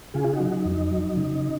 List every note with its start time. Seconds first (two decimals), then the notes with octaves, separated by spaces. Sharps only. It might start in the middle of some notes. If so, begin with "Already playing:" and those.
0.14 C#3 F4 G#4
0.24 F4
0.33 D#4 F#4
0.40 F#3
0.52 D#4
0.65 F2
0.72 D#4
0.91 F#3
1.17 C#3